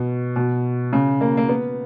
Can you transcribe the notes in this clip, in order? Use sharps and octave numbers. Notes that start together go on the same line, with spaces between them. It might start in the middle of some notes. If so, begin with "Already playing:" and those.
Already playing: B2
B2
C#3
A#3
A#3
B3